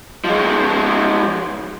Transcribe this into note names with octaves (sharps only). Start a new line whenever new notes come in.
F3 G#3